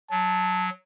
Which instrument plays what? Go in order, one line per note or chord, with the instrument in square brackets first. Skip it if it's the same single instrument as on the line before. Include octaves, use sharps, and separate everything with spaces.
[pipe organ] F#3 [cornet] A5